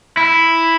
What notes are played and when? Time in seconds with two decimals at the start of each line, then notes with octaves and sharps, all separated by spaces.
0.17 E4